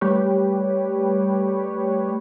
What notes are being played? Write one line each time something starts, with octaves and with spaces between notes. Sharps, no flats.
G3 A3 G4 B4 C#5